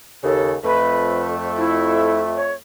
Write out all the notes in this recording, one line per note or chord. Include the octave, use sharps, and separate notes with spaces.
D#2 C#3 A4
F2 A3 B4
E4
C#5